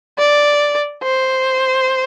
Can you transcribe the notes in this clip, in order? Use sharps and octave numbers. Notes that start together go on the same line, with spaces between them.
D5
C5